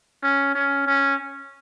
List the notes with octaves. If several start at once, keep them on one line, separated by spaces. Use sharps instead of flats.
C#4
C#4
C#4